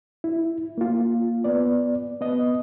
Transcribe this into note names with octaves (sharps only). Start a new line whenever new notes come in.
E4
A#3 F4
B3 D5
B3 D#5